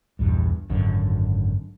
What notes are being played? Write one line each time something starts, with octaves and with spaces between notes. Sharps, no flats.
A#1 E2 G2
G#1 F#2 D3